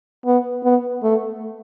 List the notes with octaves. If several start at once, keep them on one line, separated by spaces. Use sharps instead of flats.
B3
B3
A3